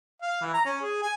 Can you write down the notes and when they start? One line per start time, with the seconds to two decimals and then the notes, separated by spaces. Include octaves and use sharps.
0.22 F5
0.41 E3
0.54 A#5
0.65 C#4
0.81 G#4
1.02 G#5